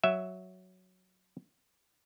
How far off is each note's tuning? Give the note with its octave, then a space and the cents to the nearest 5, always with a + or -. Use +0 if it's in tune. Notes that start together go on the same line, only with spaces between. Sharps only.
F#3 +0 E5 +0